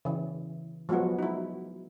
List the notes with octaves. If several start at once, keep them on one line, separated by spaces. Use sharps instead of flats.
C#3 E3
F3 F#3 G#3 B3 F#4
D#4 E4